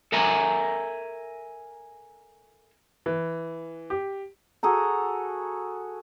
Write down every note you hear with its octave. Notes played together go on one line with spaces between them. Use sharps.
A4 A#4 E5 G#5 A#5
E3
G4
F#4 G#4 A4 A#5